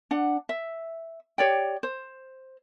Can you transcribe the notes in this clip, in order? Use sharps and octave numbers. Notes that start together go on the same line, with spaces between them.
D4 F#5
E5
G4 C#5 D5 G5
C5